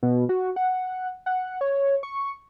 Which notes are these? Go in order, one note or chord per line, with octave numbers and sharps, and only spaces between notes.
B2
F#4
F#5
F#5
C#5
C#6